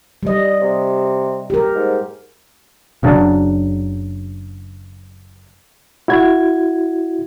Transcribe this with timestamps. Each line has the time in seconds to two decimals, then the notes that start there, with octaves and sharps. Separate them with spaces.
0.23 G3 D#5
0.61 C3
1.50 G4 A#4
1.74 G#2
3.03 F#1 C#3 F#3 D4
6.08 E4 F#4 G#6